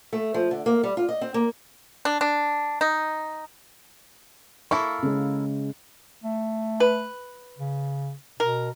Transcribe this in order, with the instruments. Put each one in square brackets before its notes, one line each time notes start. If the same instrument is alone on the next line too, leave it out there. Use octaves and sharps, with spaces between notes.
[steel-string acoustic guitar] A3
F3
D3
A#3
G3
F4
D#5
C4
A#3
[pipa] D4
D4
D#4
[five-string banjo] A#3 E4 A4 [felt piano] C#6
[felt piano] C#3 G#3
[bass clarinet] A3
[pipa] B4
[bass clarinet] C#3
[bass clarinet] B2 [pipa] A#4